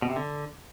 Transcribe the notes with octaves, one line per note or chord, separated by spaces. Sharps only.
B2
C3
D3